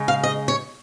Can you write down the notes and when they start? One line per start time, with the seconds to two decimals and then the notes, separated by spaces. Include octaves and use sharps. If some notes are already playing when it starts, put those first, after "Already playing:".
Already playing: C#3 G#3
0.08 F5
0.23 D#5
0.48 C#5